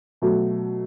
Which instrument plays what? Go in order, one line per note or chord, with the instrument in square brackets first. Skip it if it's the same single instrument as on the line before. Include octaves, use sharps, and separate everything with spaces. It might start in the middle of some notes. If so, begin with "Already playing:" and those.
[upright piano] B2 F#3 A3